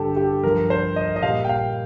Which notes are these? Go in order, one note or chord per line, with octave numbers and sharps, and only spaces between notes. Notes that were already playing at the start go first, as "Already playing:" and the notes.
Already playing: G2 D3 G3 G4 A4
G4
G2 F3 A#4
C5
D#5
D#5
A#2 G3 F5
G5
F5